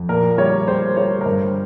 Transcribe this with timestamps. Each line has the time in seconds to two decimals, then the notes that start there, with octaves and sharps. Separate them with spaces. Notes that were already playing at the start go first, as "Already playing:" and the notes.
Already playing: F2
0.09 A#2 A#4
0.38 G3 C#5
0.68 G3 C5
0.96 G3 C#5
1.21 A#4
1.26 G2 C5